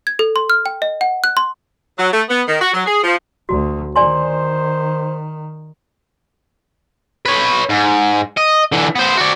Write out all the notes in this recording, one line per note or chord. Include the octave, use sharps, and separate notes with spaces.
G#6
A4
C6
F6
G5
D#5
F#5
F#6
C6
F#3
A3
B3
D#3
F#4
F#3
G#4
F3
D2 F#4
D#3 C5 D5 G#5 C6
B4 C#5
G#2
D#5
D3 E3
B3 C5
F#4 D5